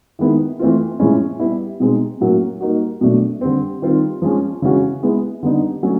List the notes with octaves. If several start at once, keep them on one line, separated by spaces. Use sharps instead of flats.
D#3 G#3 B3 E4
E3 A3 C4 F4
A2 F3 G#3 C#4 E4
G3 B3 E4
B2 G#3 C4 D#4
A2 F#3 A#3 C#4 F#4
G3 A#3 D#4 F#4
B2 F#3 A3 D4
D3 G3 C4
D#3 G3 C4 F4
F3 G#3 C#4
C#3 E3 G#3 C#4 F#4
G#3 B3 E4
D3 G3 B3 D#4
F#3 A3 C#4 F#4